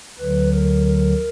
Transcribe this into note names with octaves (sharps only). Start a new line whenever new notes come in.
D2 D3 F#3 B4
A#4
A#4